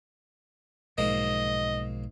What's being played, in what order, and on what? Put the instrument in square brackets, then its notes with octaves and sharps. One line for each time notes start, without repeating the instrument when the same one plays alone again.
[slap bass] B1 F3 [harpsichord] G#2 A#3 [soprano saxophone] D#5